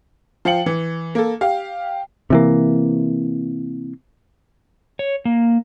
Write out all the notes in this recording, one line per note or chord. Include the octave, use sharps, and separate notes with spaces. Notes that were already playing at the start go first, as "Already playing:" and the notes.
F3 F5 G5 C#7 F#7
E3
A#3 A4
G4 F5
C3 E3 A#3
C#5
A#3